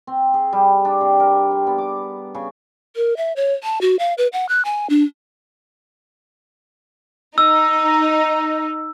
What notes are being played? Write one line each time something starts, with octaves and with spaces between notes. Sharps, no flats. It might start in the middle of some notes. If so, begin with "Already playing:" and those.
C4
G#4
G3
D4
C3
A#4
G5
B3
D6
C#3
A#4
E5
C#5
A5
F#4
F5
B4
F#5
F#6
G#5
D4
D#4 E6